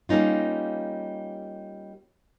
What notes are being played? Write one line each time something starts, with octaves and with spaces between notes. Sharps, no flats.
G3 A#3 C#4 D#4 F4